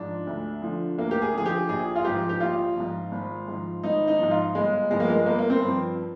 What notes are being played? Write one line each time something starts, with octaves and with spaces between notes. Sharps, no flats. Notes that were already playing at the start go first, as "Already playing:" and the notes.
Already playing: G#2 F3 D4
D2
D3 F3
D2 A#3
G4
G#4
D3 F3 G#4
G4
A#1 G#4
F4
G#2 F3 G4
G4
A#1 F4
G#2 F3
G#1
G#2 F3
G#1 D#4
D#4
G#2 F3
F4
G1 G#3
G2 F3 G#3
A#3
G#3
G1 A#3
A#3
C4
G2 F3